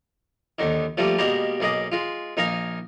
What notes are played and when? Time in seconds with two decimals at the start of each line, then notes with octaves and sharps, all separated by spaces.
0.59 D#2 D3 D#3
0.97 F3 G3 A3 A#3
1.18 B2 G3 G#3 A#3 G4 A#5
1.60 B1 A#3 G#4 D#5 D6
1.92 G#3 F4
2.37 A#1 D#4 A#4 F5 G#5